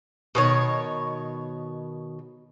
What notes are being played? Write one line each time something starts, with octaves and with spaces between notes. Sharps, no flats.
B2 D#3 C#5